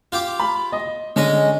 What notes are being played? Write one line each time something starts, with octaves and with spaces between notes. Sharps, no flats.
F4 G4 D6
B5
D#5
D3 G#3 C#4 D#5